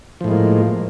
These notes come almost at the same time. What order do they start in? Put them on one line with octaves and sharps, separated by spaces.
F3 A2 G#3 A#3